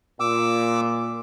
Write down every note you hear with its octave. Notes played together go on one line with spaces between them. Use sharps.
A#2 D6 E6